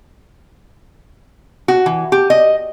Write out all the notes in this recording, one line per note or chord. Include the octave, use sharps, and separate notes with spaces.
F#4
E3
G4
D#5